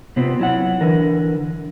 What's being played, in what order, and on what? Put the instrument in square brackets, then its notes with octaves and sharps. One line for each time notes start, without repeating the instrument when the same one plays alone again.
[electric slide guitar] C3 B3 C4 F4
F#3 E4 F#5
D3 E3 A#4